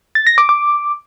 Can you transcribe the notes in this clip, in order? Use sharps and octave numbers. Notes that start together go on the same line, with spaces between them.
A6
A#6
D6
D6